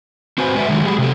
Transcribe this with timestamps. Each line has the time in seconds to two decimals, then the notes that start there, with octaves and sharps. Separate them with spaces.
0.38 C4 F#4 B4 C5 G#5
0.54 G#3 B4 D5 E5
0.68 D3 D#3 F#3 G#3 A3
0.85 F#3 G4 G#4
0.99 C3 A4